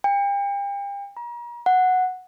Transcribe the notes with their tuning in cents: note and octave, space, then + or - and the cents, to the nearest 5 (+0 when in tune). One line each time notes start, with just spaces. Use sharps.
G5 +40
A#5 +40
F#5 -5